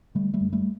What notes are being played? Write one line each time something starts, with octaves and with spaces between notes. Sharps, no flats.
D3 G3 A3
G3 A3
F#2
G3 A3